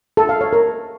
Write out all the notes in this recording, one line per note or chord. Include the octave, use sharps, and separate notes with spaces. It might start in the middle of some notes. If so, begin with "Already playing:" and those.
A4
F5
C#5
A#4